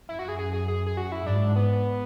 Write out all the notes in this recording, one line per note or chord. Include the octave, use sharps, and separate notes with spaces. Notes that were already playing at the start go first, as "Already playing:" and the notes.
F#2 E4
F#4
G#4
G#4
G#4
G#4
G#4
F#4
E4
G#2 D4
B3